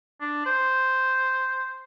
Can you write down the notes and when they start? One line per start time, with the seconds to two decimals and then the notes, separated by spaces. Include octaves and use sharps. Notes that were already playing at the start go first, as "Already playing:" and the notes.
0.21 D4
0.46 C5